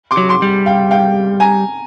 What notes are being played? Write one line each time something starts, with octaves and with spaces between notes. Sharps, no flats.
C6 D6
F#3
C6 D6
G3
F5 G5
F5 G5
G#5 A#5